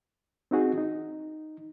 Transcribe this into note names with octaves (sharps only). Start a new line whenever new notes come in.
C4 D#4 F#4 G#4
D#4